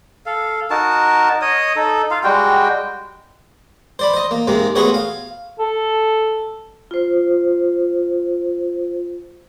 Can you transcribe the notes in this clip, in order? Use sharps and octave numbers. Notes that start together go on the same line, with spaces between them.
A4 F5
D#4 F#4 A#4 A5
C#5 D#5 D#6
D#4 A4
F4 F5
G3 G#3 F#4 G5
C5 D5 B5
C5 D#5
A#3
G#2 C3 G#3 A#3
A3 B3 F#4 G#4 C5 C#5
F5
A4
F4 C5